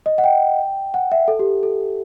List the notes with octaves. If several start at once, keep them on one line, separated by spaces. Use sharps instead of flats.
D#5
F#5
G5
F#5
E5
A4
G4
A4